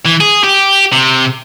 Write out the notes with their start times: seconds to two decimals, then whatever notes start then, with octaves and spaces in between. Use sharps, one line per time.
0.06 E3
0.21 G#4
0.44 G4
0.92 C3